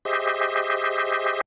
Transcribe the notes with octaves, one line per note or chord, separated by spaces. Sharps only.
G4 G#4 C5 D#5 E5